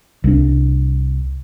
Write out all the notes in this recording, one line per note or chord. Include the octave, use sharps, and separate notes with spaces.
C2 D4